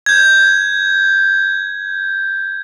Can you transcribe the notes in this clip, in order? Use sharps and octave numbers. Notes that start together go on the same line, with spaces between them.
G6 G#6